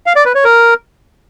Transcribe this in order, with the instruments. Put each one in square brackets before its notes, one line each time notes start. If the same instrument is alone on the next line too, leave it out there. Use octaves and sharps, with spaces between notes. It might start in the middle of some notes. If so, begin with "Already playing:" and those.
[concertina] F5
D5
B4
C#5
A#4